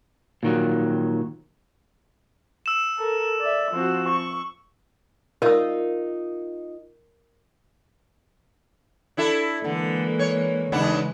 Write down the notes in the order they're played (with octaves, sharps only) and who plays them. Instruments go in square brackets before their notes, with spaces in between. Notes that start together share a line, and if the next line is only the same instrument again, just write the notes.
[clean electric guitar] A#2 D#3 F#3
[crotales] E6 E7
[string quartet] A4 A#4
D5 E5
F3 C4 F#4
C#6
[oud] D#4 F4 [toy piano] A#4 E6
[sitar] D4 E4 A4
[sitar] D3 [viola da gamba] E3 G#3 A#3
[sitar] C#5
[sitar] D#2 B3 D4 [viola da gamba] C#3 E3 G#3